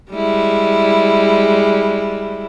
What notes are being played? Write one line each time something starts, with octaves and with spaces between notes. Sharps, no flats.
G3 G#3 E4